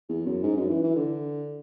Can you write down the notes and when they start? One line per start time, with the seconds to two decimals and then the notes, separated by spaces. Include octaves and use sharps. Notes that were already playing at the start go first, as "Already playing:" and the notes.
0.09 E2
0.26 F#2
0.43 G#2
0.57 F#2
0.70 E3
0.83 E3
0.95 D3